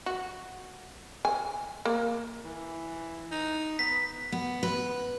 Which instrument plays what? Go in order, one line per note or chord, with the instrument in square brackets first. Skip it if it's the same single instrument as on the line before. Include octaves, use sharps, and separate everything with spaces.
[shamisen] F#4
G#5
A#3
[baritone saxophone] E3
D#4
[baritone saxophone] B3 [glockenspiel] B6
[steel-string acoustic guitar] B3
B4